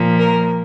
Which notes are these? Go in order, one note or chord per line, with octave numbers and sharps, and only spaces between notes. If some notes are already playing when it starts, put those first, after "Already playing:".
Already playing: A#2 F3 A#3
A#4